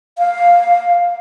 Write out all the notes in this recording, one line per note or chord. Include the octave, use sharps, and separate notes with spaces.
F5